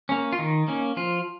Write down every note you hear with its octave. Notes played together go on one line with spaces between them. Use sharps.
A#3 C#4
F4
D#3 D#4
A#3 C#4
F3 F4